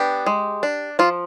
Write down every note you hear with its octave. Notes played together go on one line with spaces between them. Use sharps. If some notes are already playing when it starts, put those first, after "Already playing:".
Already playing: B3 D4 G4
G#3
D4
F3 F4